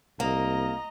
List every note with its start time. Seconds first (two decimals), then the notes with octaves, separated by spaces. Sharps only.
0.20 C2 A#3 D#5 A#5